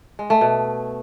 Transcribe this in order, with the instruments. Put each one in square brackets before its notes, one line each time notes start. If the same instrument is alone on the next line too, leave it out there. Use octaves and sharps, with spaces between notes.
[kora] G#3
A3
B2